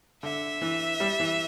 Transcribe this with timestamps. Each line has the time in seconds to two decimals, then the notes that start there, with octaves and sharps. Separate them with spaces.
0.23 D3 E5
0.62 E3
1.00 G3
1.20 E3